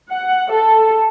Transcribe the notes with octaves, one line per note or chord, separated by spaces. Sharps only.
F#5
A4